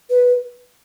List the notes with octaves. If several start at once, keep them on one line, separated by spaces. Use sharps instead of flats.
B4